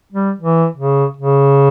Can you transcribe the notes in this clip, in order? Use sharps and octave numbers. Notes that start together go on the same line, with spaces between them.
G3
E3
C#3
C#3